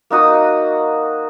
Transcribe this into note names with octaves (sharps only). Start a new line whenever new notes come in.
A#3 D#4 F#4 D#6